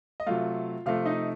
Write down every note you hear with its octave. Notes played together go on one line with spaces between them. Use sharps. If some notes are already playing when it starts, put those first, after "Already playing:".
D#5
C3 F#3 A3 F4 F5
C3 F3 A3 F4 F5
D#4 D#5